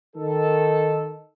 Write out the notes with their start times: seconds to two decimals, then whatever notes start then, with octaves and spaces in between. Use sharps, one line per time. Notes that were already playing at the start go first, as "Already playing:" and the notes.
0.16 D#3 A4